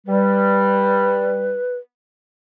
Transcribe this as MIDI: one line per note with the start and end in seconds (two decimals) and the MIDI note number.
0.07 1.58 55
0.07 1.76 71